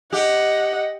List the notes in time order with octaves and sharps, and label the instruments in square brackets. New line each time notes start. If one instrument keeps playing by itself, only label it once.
[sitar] G4 [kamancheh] D#5 F#5